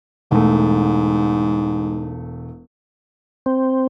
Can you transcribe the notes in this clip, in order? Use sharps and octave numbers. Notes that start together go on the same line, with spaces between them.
E1 G#2 A3
C4